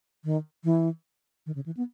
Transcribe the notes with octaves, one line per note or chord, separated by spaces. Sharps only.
D#3
E3
D#3
C#3
E3
B3